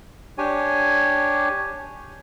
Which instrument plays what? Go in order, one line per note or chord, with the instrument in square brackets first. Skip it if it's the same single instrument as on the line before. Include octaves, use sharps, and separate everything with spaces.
[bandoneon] D4 G4 C#5 G#5